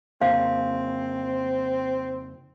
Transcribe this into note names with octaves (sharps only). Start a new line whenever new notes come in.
F2 C#3 A#3 C4 F5